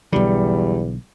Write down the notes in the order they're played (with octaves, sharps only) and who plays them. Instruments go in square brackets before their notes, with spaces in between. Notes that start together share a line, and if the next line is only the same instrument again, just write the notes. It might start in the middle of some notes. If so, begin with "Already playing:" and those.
[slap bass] B1 D3 [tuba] E2 [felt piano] G3